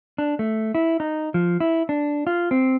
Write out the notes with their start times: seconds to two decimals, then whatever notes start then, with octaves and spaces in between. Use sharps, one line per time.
0.18 D4
0.39 A3
0.75 E4
1.00 D#4
1.34 F3
1.60 E4
1.89 D4
2.27 F4
2.51 C4